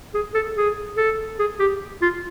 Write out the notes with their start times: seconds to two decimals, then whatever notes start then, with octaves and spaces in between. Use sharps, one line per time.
0.14 G#4
0.34 A4
0.56 G#4
0.97 A4
1.39 G#4
1.60 G4
2.02 F4